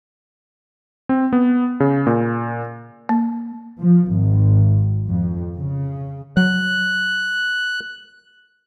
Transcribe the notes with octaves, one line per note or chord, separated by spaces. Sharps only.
C4
B3
C#3
A#2
A#3
F3
G#1
F2
C#3
F#3 F#6